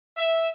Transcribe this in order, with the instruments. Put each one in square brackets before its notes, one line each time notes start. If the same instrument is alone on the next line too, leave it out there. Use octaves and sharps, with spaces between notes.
[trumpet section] E5